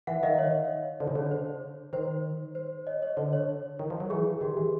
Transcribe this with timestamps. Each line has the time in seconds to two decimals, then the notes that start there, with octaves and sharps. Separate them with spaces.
0.07 E3 E5 F#5
0.23 D#3 D#5 F5
0.38 C#5 D#5
1.00 D3 C5 D5
1.08 C#3
1.16 D3 C#5
1.31 C5
1.93 D#3 C5
2.55 C5
2.87 C#5 D#5
3.02 C#5 D#5
3.17 D3 C5 D5
3.33 C#5
3.79 D#3
3.90 F3
4.00 F#3
4.10 E3 G#4
4.41 D#3 G4
4.57 E3